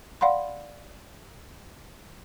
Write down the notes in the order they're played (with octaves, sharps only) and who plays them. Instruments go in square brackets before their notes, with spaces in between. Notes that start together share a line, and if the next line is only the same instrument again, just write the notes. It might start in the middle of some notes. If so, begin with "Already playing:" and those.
[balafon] D5 F5 F#5 B5 C6